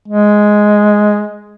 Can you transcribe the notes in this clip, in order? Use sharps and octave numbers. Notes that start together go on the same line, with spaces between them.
G#3